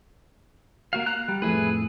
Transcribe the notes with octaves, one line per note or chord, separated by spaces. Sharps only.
A#3 F#4 F5
A#5 F#6
G3
F2 A2 E4 G#4 B4